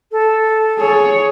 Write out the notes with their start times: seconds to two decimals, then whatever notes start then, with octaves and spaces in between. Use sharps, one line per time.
0.12 A4
0.78 G#4 C#5